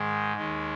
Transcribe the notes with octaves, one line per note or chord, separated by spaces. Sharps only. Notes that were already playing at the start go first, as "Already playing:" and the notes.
Already playing: G#2 D#3 G#3
D#2 D#3 G#3